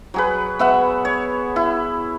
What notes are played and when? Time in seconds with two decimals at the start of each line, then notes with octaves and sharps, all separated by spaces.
0.14 F#3 G#4 B4
0.59 B3 E5 F#5
1.05 C#5
1.56 E4